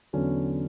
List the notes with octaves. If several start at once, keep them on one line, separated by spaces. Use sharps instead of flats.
E2 D3 F#3 C#4